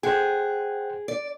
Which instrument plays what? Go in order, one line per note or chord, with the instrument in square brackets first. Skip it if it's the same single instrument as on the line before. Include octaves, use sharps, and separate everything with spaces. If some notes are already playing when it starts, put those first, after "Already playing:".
[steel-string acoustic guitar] G#4 [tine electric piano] C5 F#5 G5
[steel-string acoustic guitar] D5